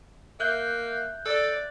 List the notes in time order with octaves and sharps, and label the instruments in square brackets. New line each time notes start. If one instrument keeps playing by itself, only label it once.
[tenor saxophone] A#3 [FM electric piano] E5 F#6 G6
[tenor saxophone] A4 [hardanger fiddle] D5